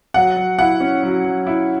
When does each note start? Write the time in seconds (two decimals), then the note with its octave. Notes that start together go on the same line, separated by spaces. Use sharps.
0.14 F#3 F#5
0.37 F#3
0.59 E4 F#5
0.80 C#4
1.03 F#3
1.24 F#3
1.47 E4